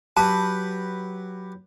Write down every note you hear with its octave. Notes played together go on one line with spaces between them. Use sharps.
F#3 G4 B4 A5